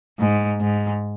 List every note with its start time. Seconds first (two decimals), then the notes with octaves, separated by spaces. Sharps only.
0.19 G#2
0.60 G#2